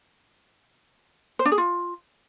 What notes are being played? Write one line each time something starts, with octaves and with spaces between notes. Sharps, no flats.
C5
D4
G#4
F4